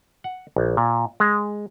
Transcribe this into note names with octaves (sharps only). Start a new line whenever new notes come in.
F#5
A#1
A#2
G#3